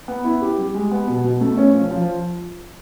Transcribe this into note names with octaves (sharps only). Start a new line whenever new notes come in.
B3
E4
G4
G3
G#3
B3
B2
B2
A3
C#4
F3
F3